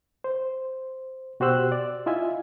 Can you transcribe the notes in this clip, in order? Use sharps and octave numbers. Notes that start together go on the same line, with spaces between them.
C5
B2 F#4 G4 C5 E6 F#6
D5
E4 F4 D#5 E5 G#5